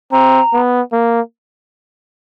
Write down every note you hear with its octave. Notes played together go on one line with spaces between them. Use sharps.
C4 A#5
B3
A#3